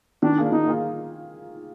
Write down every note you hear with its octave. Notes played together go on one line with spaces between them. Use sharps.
D#3 D4
A#3 F4 G#4
D#3 D#4
A#3 F4 G#4